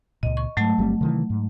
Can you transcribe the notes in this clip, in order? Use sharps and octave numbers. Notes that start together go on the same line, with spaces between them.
C#2 A#2 D#5
C#6
G#2 F#3 A3 A5
G1 G3 C4
C3 D#3 E3
G#2